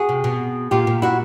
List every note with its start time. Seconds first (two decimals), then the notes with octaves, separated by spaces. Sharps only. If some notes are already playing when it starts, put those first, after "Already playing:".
Already playing: F#4 G#4
0.09 C3
0.24 B2
0.71 A#2 F4 G4
0.87 A#2
1.02 E4 F#4